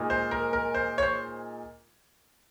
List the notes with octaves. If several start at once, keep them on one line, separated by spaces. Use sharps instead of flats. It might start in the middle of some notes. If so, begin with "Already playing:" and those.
Already playing: A#2 G#3 D#4
C5
A#4
A#4
C5
C#5
C5